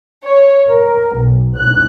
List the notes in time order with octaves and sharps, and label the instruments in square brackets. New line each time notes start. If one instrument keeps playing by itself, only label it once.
[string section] C#5
A#4
B1
F#6